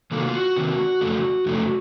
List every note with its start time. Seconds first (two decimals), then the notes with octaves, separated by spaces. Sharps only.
0.11 C3 D#3 A#3 A4
0.20 F#4
0.27 F4
0.34 F#4
0.56 C3 D#3 A#3
1.01 F2 C#3 F#3 A3
1.46 F2 C#3 F#3 A3